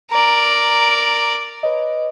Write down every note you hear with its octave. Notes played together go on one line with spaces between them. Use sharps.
A#4 D5 A#5
B4 C#5 D#5